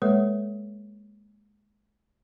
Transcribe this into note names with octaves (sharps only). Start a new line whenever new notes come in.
G#3 A#3 A4 B4 C#5 E5